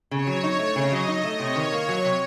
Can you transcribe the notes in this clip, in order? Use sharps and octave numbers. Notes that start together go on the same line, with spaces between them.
C#3 C#5
F#3
D#4
A3
C#3 D#5
F#3
D#4
A3
C3 C#5
D#3
A#3
F#3
C3